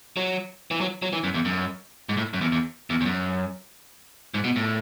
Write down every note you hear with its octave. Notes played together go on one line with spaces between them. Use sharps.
F#3
E3
F#3
F#3
E3
F#2
E2
F#2
G#2
A2
F#2
E2
E2
E2
E2
F#2
G#2
B2
A2